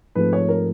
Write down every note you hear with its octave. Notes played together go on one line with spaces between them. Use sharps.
G#2 F3 A3 C4 B4
C#5
A#4